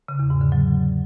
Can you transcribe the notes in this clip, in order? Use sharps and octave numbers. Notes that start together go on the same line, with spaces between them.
C#3
E2
G#2
D3
F#3